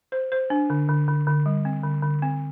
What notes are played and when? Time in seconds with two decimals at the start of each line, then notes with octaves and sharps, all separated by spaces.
0.12 C5
0.32 C5
0.50 D4
0.70 D3
0.89 D3
1.08 D3
1.27 D3
1.46 G3
1.65 C4
1.84 D3
2.03 D3
2.22 C4